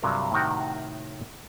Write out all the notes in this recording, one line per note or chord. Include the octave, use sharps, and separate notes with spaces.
G2 C3 F#3 F4 A#4
A2 C3 D#3 F#4 G5